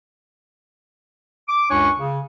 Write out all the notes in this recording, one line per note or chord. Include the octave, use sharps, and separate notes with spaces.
D6
C#2 F#2 D4 C#5 G#5 C#6
C#3